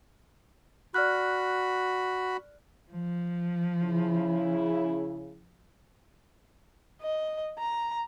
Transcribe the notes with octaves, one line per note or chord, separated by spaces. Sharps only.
F#4 D5 B5 F6 F#6
F3
C#3 E4
D#5
A#5